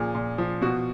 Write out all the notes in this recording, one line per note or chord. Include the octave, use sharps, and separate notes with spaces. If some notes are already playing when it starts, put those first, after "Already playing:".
Already playing: A#2 F3 G#4
A#2
F3
B2 F#4